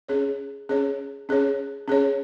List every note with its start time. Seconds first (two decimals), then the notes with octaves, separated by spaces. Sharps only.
0.09 C#4 G#4 C#5
0.69 C#4 G#4 C#5
1.29 C#4 G#4 C#5
1.88 C#4 G#4 C#5